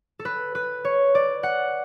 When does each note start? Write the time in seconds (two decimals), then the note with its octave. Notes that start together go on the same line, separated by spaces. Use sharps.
0.19 A4
0.25 B4
0.55 B4
0.85 C#5
1.15 D5
1.43 F#5